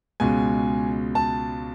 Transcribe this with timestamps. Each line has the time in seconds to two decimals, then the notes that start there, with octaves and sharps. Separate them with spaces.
0.20 C#2 B2 G#3 C#4 G#5
1.15 A5